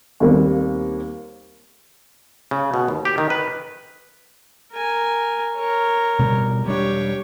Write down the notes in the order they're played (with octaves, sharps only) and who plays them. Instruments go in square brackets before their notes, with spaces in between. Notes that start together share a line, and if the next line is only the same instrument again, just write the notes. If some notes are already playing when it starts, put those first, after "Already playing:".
[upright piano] D#2 G3 A#3 C4
[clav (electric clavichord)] C#3
B2
D#2
G4
D#3
B4
[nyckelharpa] A#4 G#5
A#4 C#5
[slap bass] B2 G3
[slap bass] E1 G3 D4 [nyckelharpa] G4 C#5